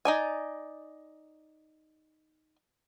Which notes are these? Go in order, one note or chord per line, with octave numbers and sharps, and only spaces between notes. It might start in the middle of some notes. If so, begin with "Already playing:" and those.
D#4 D5 G#5